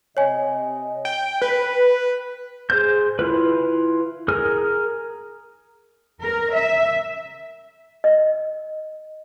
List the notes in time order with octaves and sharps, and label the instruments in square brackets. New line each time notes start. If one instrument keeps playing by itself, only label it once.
[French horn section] C3 D#5 [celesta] C#5 G#5
[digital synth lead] G5
B4
[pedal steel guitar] G#4 C5 G6
E4 F4 B4
G#4 A#4 D#6 F6
[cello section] A#4
E5
[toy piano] D#5